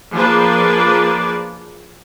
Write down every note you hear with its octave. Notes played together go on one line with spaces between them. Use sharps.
F3 A#3 D4 G#4 B4 D5